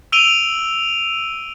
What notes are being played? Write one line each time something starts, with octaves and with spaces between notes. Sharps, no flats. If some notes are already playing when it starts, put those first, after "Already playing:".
E6 D7 D#7 F7 G7